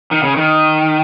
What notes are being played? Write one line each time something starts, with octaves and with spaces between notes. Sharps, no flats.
D#3
C#3
D#3